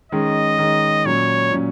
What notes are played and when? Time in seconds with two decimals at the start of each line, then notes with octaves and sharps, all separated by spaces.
0.12 D#3 G#3 C#4 D#5
0.59 D#3 G#3 C#4
1.05 A#2 F#3 C#4 C#5
1.52 A#2 F#3 C#4